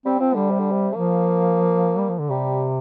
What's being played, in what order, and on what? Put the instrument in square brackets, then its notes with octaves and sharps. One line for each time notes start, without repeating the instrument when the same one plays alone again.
[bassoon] G3 [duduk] C4
[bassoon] F3 [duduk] C4
[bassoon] D3 [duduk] G3
[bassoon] C3
D3
C3
[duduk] F3 [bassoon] A#3
[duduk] G3
F3
D3
[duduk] C3 [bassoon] G3